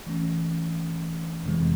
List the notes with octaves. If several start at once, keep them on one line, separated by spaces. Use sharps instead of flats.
E3 A3 C#4
F2 C3 E3 G#3